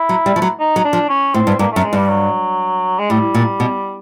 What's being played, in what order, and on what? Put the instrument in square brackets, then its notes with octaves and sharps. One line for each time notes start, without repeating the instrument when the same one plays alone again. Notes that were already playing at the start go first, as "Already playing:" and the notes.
Already playing: [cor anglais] E4
[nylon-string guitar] F#3
G3
F3
F#3
[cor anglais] D#4
[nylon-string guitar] F#3
[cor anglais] D4
[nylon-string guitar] F3
[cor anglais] C#4
[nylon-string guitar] A2 [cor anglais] C4
[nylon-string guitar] G2
[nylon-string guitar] G2 [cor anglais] A#3
[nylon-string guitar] F#2 [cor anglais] A3
[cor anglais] G#3
[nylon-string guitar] G2 [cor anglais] G3
[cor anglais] F#3
G#3
[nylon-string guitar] A2 [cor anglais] G3
[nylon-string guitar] A#2
B2